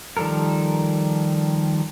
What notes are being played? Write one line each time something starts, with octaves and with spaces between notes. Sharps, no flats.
D#3 F3 G3 A4 A#4